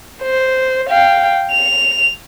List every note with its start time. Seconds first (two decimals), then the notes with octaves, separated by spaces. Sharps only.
0.22 C5
0.89 F5 G5
1.53 F7